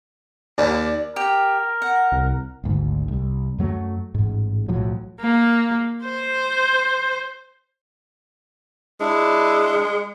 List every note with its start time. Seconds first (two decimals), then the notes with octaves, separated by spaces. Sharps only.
0.58 D#2 D5
1.16 G4 A#4 G5
1.82 F#5
2.12 C2
2.64 G#1 D2 G#2
3.08 C2
3.58 F#2 F#3 G#3 A3
4.14 A1 G#2
4.68 B1 A2 F3 F#3
5.20 A#3
6.05 C5
9.01 G#3 D4 E4